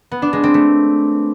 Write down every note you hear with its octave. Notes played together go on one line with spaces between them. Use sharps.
B3
D4
G#3
C4
A3